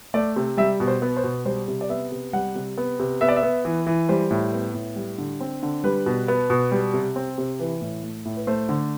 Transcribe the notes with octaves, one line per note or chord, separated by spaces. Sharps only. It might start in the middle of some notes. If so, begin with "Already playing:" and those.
A3 D5
C3
G3 E5
B2
C5
B3
C5
B2
G3 C5
C3
D5
B3 E5
C3
G3 F#5
C3
B3
C3
B3 E5
D5
E5
B3
E3
E3
G3 C5
A2
B3
A2
G3
D3
C4
D3
G3 B4
B2
B3
B2
G3
C3
C4
C3
E3 B4
A2
A3
A2
B4
A3 C5
D3